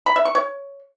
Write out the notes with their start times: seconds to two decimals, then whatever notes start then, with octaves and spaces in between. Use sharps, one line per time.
0.06 B5
0.16 E5
0.25 C#6
0.35 C#5